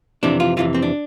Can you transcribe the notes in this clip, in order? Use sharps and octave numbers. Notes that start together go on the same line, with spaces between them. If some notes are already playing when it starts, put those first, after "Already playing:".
F2 C3 E3 D4
F4
F2 C3 E3 F4
C4
D4